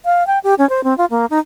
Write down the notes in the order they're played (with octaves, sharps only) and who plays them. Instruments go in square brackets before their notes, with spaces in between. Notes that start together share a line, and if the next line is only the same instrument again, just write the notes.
[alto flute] F5
G5
G4
C#4
C5
C4
F4
A#3
D#4